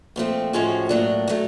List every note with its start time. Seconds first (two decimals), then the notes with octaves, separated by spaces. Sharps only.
0.16 A#2 F3 A3 C4
0.53 A2 F3 G#3 C#4 F#4
0.89 A2 F#3 A#3 D4
1.28 D#3 F#3 A3